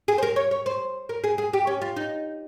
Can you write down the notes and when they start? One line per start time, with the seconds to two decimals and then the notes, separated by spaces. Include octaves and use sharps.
0.08 G#4
0.18 C5
0.22 A#4
0.36 C#5
0.51 C#5
0.66 C5
1.09 A#4
1.24 G#4
1.38 G#4
1.53 G4
1.67 C#4
1.82 F4
1.96 D#4